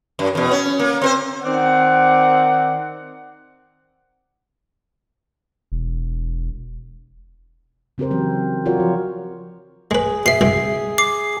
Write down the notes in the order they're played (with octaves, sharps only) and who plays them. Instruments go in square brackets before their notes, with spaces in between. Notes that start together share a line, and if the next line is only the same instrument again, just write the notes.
[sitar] F#2
E2 B2
C#4
A#3
C4 A#4 C5
[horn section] D#3 C4 D5 F#5
[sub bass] E1
[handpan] C#3 C4 G4 A#4 C5
E3 F#3 C4
F4 F#4 A#4 C#5 D5
F3
[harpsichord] G#3 B4 [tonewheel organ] G#4
[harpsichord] B2 [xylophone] E5 C7
[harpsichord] C2 B2 G#3
[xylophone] D6 C7